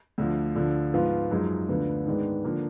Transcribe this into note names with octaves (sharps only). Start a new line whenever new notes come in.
D2 D3 F3
D2 D3 F3
G#2 F3 B3 F4
F#2 F3 G#3 D#4
D2 D3 F3 B3
G#2 D#3 G#3 B3 D4
D3 F3 A#3